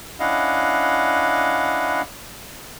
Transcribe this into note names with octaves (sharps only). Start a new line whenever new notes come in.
C#4 D4 E4 D#5 F5 F#5